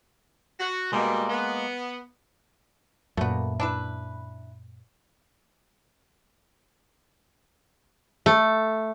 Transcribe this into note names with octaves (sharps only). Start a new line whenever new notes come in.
F#4
B2 G3 G#3 A#3
B3
F#2 A#2 A3 B3
D4 E4 B4
A3